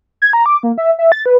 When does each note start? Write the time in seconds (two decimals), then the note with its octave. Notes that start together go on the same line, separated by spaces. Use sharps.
0.22 G#6
0.33 A#5
0.46 D6
0.63 A#3
0.78 E5
0.99 E5
1.12 A6
1.26 B4